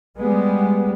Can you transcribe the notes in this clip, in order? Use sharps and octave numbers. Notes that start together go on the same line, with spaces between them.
G3 G#3 B3